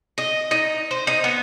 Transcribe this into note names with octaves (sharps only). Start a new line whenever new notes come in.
D#5
D#4
C5
D#4
B3